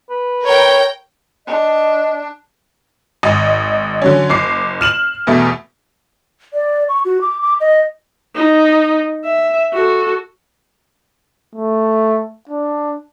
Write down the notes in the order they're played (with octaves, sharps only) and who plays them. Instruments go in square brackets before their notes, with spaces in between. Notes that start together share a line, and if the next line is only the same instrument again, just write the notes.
[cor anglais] B4
[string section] A#4 G5 [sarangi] C#5
[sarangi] D4 [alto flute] D#5
[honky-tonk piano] G#1 D#5
D3 F#3 C#4
F#1 D6 C7
F6 E7 F#7
E2 B2 A3
[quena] D5
C#6
F#4
D6
D6
D#5
[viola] D#4
E5
F#4 A4
[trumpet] A3
D4